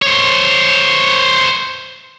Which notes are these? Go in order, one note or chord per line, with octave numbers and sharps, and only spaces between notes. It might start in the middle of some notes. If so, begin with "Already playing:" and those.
C5 C#5